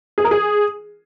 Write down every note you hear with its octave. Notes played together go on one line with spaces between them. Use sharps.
G#4
A#4
G#4